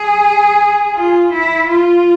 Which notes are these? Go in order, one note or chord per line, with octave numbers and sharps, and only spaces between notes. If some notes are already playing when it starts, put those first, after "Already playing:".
Already playing: G#4
F4
E4
F4